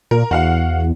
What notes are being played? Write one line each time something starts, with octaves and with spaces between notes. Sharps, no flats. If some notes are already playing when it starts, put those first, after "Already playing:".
A#2 A#4
E2 F#4 F5 F#5